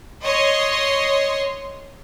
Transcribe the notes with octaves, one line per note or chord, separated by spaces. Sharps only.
C#5 D#5 C6